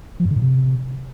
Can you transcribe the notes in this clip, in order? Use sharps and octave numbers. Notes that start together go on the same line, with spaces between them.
F3
G2
D3
A2
C3